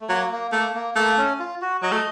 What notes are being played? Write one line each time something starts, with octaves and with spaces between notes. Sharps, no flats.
A3
F#3 A#3
A#3
A3 A#3
A#3
A3 A#3
C#4
F4
F#4
F#3 D#5
A3